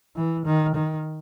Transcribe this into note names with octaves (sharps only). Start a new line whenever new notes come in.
E3
D#3
D#3